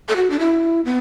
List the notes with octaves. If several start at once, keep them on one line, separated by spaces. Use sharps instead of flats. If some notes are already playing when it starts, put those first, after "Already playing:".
A4
F#4
D4
E4
B3